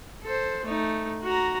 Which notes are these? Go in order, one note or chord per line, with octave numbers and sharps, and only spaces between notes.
A4 C5
A3 D#4
F#4 A#5